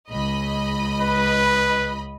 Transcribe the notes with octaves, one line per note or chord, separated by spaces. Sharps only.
C#2 D#5 B5
B4